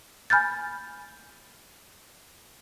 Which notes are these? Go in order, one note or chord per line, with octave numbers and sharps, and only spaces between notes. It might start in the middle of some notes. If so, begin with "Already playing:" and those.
G#5 B5 F6 G6 A6